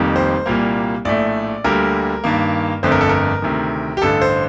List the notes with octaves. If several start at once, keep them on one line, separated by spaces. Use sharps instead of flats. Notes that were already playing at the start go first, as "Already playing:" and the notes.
Already playing: F1 F2 D#3 G3 A#3
C5
C2 A#2 G3 A#3
A#1 A2 A3 D5
D2 D3 G3 A#3 A#4
G2 D#3 A#3
G1 F2 D3 A3 C5
A#4
A4
A#4
D2 C3 D#3
G4
A1 G2 D3 A4
C5